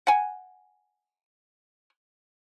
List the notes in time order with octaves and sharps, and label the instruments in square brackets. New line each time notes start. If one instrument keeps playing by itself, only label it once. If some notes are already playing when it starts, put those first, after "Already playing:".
[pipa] F#5 G#5